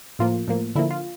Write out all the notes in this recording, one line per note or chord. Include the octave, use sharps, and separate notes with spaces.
A2 F3 A#3 F4
A2 F3 A#3
D3 F3 A#3 E4
F4